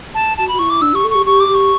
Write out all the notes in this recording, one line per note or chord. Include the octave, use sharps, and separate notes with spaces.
A5
F#4 A5
F#4 B5
E4 C#6
D6
D4 E6
G4 C#6
A4
G4 C#6
G4 C#6
D6
G4
C#6